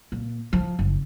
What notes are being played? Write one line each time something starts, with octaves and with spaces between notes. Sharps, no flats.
A#2
F3
F#1